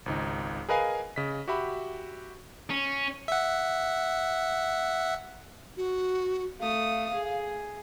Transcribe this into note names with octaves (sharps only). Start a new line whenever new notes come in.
G#1 C#2 D#4
G#4 A#4 B4 D#5 F5 G#5
C#3 D#5 B6
F#4 G4 E5 B5
C#4
E5 F#5
F#4
A3 F5 D#6
G#4